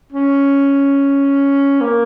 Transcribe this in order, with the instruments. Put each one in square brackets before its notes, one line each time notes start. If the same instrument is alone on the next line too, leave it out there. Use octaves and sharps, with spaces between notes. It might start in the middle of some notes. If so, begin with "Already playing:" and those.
[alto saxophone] C#4
A#3